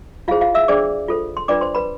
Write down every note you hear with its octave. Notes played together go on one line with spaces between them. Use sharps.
E4 F4 G#4 C5 F5
F4 F5
E5 E6
D4 G#4 C5 D5 D6
F4 A4 C5
C6
D4 F4 B4 D5 D6
C5 C6
B4 B5